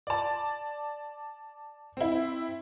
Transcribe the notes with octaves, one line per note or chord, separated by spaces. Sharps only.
D5 A5
C4 E4